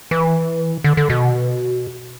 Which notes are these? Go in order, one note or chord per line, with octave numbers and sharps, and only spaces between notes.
E3
D3
D3
B2